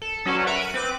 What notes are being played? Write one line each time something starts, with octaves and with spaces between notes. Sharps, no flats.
A4
F#3 C#4 F#4 A4 B4 D5
A#4 B4 E5 F#5 B5
C#7 D#7
C4 B4 D6